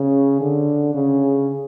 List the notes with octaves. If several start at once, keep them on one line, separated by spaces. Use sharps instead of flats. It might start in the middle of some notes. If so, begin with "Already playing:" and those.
Already playing: C#3
D3
C#3